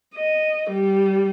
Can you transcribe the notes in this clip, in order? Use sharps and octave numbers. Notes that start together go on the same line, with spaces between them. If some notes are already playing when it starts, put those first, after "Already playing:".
D#5
G3